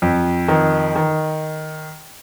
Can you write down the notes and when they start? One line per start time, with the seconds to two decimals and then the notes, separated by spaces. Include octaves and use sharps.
0.02 F2
0.48 D#3
0.96 D#3